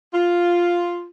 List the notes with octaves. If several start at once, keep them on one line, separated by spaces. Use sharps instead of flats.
F4